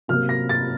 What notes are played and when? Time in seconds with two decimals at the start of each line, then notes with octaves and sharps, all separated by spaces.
0.08 C3 F#3 A#3 F6
0.29 A#6
0.49 A6